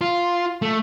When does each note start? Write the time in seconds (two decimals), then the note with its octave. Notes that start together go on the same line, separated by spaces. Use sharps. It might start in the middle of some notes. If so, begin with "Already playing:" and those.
0.01 F4
0.62 A3